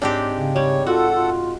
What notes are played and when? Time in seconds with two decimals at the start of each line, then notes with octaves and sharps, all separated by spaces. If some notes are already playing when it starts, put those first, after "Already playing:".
0.02 G#2 C4 D4 G4
0.37 C#3
0.56 G3 C#5
0.87 F4 F#4 A4 F#5
1.14 F4